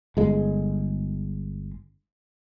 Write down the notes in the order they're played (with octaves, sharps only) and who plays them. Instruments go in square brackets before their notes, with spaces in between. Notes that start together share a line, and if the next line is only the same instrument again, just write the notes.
[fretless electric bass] G1 G#3